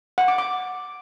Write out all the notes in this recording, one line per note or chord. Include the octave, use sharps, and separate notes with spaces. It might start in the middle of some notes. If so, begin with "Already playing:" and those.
F#5
D6
D6